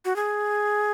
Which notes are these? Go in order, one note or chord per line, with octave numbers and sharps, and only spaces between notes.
F#4
G#4